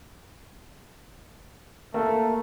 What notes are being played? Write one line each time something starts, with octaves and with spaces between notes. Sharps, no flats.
A3 A#3